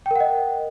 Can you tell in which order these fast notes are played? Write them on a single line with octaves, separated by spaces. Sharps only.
G5 A#4 F#5 D#5